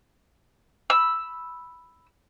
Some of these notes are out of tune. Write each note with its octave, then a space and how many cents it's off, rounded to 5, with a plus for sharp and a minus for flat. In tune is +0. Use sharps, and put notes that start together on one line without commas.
B5 +0 E6 +0